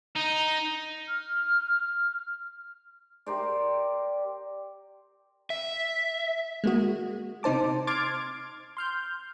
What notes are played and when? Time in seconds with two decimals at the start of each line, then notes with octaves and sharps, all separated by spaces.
0.16 D#4
1.08 F6
3.26 G4 A#4 C5 D5
5.50 E5
6.64 G#3 A#3 F#4
7.43 C3 D#4 C5 A5 D6
7.87 C6 D6 F6 G#6 A6 D7
8.77 C6 F6 G6